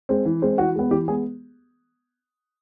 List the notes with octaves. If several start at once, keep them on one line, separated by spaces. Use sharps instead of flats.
G#3 C4
E3
G#3 C4
E3 F#4
G#3 B3
E3 G4
G#3 B3 G#4